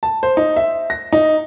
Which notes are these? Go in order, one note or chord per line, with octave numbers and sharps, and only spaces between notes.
A5
C5
D#4
E5
A#6
D#4